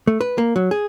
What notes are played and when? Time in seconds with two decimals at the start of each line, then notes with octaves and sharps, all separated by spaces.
0.07 A3
0.21 B4
0.38 A#3
0.56 F#3
0.71 G#4